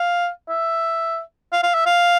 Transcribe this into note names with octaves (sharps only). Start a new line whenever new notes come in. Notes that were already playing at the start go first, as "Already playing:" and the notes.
Already playing: F5
E5
F5
F5
E5
F5